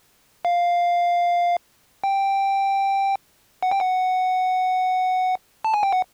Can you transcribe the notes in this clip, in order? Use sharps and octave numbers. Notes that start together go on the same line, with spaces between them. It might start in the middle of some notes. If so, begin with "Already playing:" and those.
F5
G5
F#5
G5
F#5
A5
G#5
G5
F#5